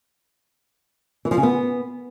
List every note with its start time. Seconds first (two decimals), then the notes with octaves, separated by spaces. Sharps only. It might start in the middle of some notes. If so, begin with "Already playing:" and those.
1.25 E3
1.31 F3
1.37 C#3
1.43 B3